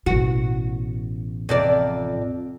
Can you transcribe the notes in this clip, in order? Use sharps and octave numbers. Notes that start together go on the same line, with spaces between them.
A1 B2 F#4
F2 C3 D5